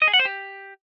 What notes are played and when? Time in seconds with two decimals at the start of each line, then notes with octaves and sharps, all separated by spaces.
0.02 D#5
0.08 G#4
0.14 F#5
0.19 C5
0.25 G4